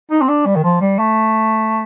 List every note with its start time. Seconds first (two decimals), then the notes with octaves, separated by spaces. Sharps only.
0.11 D#4
0.21 C4
0.29 D4
0.46 G3
0.56 D#3
0.64 F3
0.81 G3
0.99 A3